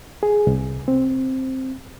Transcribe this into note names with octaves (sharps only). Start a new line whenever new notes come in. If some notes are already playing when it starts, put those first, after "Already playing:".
G#4
C2
C4